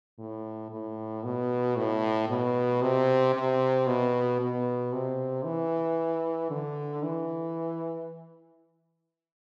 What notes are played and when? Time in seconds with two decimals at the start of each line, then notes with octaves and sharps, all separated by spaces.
0.19 A2
0.71 A2
1.25 B2
1.77 A2
2.29 B2
2.82 C3
3.34 C3
3.87 B2
4.40 B2
4.93 C3
5.45 E3
6.51 D3
7.03 E3